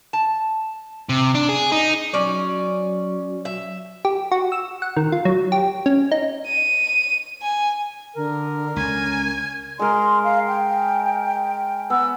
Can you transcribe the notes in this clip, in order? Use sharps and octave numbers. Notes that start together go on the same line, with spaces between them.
A5
C3
D4
G#4
D#4
F#3 C#4 D5
E5
G4
F#4
E6
F#5
D#3
F4
F#3
G4
C#4
D#4
D#7
G#5
D3 A#4
C#2 C#4 G#5
G#3 A#4 C6
F5
G5
B3 E6